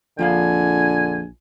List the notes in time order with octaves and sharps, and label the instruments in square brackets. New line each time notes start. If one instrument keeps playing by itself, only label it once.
[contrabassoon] A#1 [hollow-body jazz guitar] F2 F3 F5 [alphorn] D3 [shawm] G#5